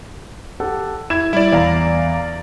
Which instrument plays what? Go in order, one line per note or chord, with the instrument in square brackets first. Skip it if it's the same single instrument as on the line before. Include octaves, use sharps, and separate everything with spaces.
[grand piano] G4 A4 F#5
[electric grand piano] E4 [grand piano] G#6 E7
[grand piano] G3 [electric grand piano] E4 D5
[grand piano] E2 [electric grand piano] D5 F5 A#5